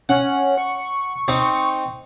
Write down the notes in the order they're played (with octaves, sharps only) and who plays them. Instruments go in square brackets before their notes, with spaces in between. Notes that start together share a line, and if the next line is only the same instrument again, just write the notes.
[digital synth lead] C#4 [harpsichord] F#5
[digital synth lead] C#6
[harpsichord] C4 D#4